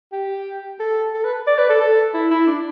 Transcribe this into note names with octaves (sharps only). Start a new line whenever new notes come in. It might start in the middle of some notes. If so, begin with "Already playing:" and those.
G4
A4
A4
B4
D5
B4
A4
A4
E4
E4
D4